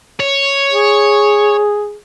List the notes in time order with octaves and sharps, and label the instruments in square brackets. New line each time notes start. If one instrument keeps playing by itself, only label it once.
[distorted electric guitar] C#5
[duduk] G#4